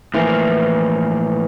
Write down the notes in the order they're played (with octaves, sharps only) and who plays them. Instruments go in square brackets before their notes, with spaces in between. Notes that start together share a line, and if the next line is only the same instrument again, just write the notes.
[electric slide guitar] A2 F3 A#3 [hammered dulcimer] E3